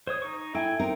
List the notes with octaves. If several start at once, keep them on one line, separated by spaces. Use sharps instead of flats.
C5 C#5 D#6
D#4 C#6
E4 A4 G5 G#5
C4 D#4 A#4 G5